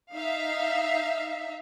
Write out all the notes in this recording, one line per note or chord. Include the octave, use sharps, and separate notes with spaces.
D#4 E5 F5